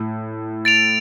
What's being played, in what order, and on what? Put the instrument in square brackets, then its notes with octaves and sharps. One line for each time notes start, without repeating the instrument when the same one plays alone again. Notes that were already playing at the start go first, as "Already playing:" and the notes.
Already playing: [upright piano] A2
[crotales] A6 D7 F7